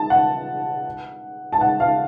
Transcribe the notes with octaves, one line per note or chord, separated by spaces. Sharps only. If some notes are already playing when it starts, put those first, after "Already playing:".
Already playing: A5
F#5
A5
F#5
F5